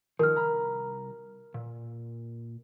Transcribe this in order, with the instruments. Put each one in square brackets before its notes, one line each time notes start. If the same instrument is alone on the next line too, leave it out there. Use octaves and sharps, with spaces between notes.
[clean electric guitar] D#3 F3 [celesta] A#4 F6
[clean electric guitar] C2 A#5 B5
A#2